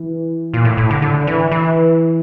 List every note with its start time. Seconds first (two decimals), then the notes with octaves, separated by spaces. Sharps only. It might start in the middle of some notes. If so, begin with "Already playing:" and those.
Already playing: E3
0.54 A#2
0.65 A2
0.77 A2
0.90 D3
1.02 D3
1.27 E3
1.51 E3